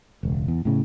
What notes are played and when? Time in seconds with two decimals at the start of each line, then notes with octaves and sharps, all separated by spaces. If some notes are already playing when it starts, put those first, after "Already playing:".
0.23 E1 C#2
0.48 E2
0.65 A2 C#3